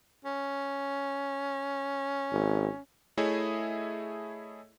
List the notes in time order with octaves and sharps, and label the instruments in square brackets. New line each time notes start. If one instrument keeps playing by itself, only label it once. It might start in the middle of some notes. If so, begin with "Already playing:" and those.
[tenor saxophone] C#4
[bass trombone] G#1
[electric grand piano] A3 E4 G#4 C#5 D#5 E5